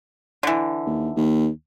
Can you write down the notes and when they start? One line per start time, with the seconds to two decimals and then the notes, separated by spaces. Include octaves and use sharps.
0.43 D3 E3
0.87 D#2
1.16 D#2